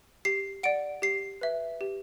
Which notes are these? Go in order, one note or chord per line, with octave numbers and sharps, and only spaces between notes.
G4 C7
D5 F#5 D7
G4 C7
B4 E5
G4